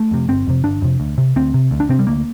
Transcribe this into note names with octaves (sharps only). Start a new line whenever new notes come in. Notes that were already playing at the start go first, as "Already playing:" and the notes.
Already playing: A3
F2 C3
G1 C4
F2 C3
G1 D4
F2 C3
D2
C3
D2 C4
C3
D2
D4
C3 C4
G3
D2 A#3